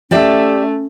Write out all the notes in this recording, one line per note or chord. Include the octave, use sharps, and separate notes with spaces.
A3 C#4 G4 D5 E5